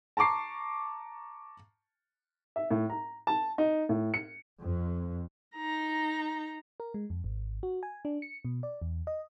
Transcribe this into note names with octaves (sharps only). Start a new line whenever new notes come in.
A5 A#5 C#6 D6 C7
E5
A2
A#5
A5
D#4
A2
C#7
F2
D#4 A#5
A#4
G#3
F2
G#1
F#4
G#5
D4
C#7
B2
D5
E2
D#5